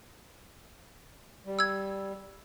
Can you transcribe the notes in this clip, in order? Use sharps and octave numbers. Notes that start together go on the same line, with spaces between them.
G3
E6 G#6